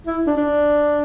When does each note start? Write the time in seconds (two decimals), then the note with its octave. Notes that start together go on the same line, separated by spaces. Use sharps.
0.07 E4
0.27 D4
0.37 D4